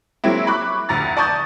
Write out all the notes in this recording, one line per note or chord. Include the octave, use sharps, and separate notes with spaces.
F#3 G#3 A#3 C4 E4
B5 C#6 D6 F#6
F1 D2 A#5 A6
D5 A5 C#6 D#6 G6 A6